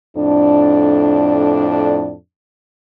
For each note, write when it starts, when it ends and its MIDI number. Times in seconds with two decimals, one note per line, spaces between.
0.16 2.15 41
0.16 2.15 45
0.16 2.15 62